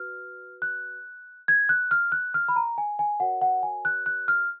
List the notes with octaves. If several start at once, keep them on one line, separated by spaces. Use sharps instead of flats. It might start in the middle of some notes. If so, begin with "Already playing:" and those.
Already playing: F#4 B4 F6
F#6
G#6
F#6
F6
F#6
F6
B5
A#5
G#5
G#5
F#4 A#4 C#5 F#5
F#5
G#5
F#6
F#6
F6